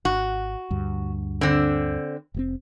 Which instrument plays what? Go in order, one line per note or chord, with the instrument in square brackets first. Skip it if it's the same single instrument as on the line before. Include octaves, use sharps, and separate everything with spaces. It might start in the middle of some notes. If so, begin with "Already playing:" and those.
[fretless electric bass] G#1 [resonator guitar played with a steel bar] F#4
[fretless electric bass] D2 G2
[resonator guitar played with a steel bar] D3 C4
[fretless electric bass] F1 A2 C4